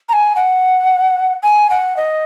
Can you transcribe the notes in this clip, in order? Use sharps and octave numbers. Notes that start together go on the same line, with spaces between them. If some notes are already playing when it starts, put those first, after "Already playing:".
A#5
G#5
F#5
G#5
F#5
D#5